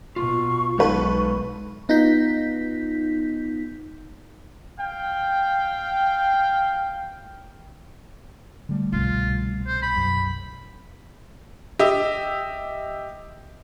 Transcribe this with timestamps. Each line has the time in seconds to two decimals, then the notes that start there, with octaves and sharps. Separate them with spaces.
0.16 B2 F4 C#6
0.78 B1 D#3 G#3 A4 B4 E5
1.89 B3 D#4 F4 G6 B6
4.80 F5 G5
8.69 D3 G3 A3
8.92 C2 B2 F4
9.67 C5
9.82 B5
9.96 B1 F#2
11.79 G4 D#5 E5